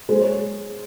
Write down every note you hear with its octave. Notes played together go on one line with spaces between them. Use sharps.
G#3 C5
C#5